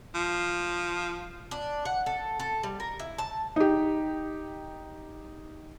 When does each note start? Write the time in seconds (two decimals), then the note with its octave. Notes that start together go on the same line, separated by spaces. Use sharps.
0.14 F3
1.51 D4
1.85 F#5
2.06 A4
2.40 A4
2.63 G3
2.80 A#4
3.00 E4
3.18 A5
3.56 D#4 G4